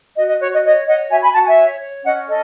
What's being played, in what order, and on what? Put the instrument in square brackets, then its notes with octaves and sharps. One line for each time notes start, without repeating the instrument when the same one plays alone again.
[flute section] F#4 D#5
D#5
F#4 C#5
D#5
C#5 D#5
C#5 D#5 F#5
F#4 E5 G#5
G#5 B5
F#4 F#5 A5
E5 G#5
C#5
C#5
C#4 D#5 F#5
A4 D#5